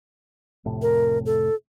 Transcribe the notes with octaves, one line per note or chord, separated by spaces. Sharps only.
F1 A2 C3
A#4
A4